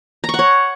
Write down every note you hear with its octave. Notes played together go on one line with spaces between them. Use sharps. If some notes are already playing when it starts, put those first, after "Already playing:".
A#5
C#6
F#5
C#5